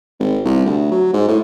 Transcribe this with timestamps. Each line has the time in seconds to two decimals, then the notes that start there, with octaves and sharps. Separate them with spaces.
0.20 G#1
0.45 C2
0.66 D2
0.91 F#3
1.13 G#2
1.29 A2